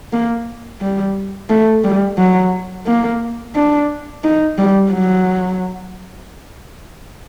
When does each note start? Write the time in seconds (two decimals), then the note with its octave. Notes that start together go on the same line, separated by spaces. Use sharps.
0.13 A#3
0.81 G3
1.50 A3
1.84 G3
2.18 F#3
2.87 A#3
3.55 D4
4.24 D#4
4.58 G3
4.92 F#3